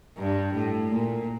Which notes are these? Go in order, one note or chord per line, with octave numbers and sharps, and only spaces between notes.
G2
A2
A#2